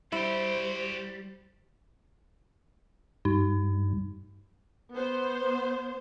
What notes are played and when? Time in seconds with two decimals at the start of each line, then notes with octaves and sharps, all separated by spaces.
0.12 G3 E4 F#4 C5 G5
3.25 G2 D#4
4.95 B3 C5